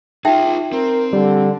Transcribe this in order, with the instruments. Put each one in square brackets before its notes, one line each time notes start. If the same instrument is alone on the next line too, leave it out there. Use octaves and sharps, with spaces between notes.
[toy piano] D#4 E5 G5 [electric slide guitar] F4 G#4
[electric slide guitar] C4 [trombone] A#4
[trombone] D3 [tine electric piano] G3